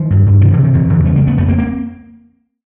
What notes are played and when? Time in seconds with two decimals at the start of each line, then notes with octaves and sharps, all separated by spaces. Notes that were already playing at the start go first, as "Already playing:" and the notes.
Already playing: D#3 F3
0.10 G2
0.26 G2
0.41 C3 D#3 F3
0.52 D3 E3
0.58 C3
0.64 D#3
0.74 E2 D3
0.90 E2 D3 E3
1.05 C#3 G3 A3
1.16 G#3 A#3
1.21 C#3
1.27 A3 B3
1.37 F2 A3 B3
1.48 A#3 C4
1.58 A#3 C4